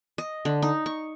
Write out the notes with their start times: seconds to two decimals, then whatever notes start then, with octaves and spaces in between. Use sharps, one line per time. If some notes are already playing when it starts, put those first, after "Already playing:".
0.18 D#5
0.45 D3
0.62 D#4
0.86 C#6